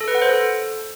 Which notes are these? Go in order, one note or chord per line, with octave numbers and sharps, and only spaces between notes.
A4
B4
F#5
C5
A4